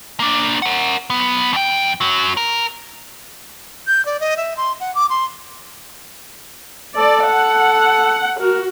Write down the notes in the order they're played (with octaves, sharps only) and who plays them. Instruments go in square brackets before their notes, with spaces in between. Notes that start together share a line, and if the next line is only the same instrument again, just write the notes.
[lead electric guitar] A#3 D4
A#4 F#5
F#3 B3
F2 G5
F#2 F#3
A#4
[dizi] G6
D5
D#5
E5
C6
F#5
D6
C6
[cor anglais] A4 [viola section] D5
[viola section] F#5
[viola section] F#4 [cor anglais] A#4